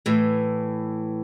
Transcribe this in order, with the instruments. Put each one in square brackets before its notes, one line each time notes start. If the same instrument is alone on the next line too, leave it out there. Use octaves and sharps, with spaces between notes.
[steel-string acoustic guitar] A2 E3